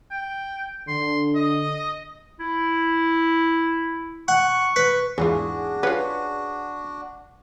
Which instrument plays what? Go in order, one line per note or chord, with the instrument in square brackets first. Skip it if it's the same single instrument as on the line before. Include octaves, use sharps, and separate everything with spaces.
[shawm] G5
[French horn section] D3 [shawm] C6
[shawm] D#5
[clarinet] E4
[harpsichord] F#5 [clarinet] C#6
[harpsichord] B4
[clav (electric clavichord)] E2 G#2 F4 [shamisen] E3 [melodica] D4 F#4 [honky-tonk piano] G#4
[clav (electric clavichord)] C#4 F4 [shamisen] B4 F#5